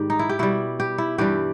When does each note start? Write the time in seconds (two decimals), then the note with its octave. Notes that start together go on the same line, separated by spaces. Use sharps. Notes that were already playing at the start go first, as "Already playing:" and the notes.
Already playing: G#2 D#3 G3 G4
0.10 D#4
0.19 E4
0.29 G4
0.39 B2 G3 E4
0.80 G4
0.98 E4
1.18 G2 E3 G3 G4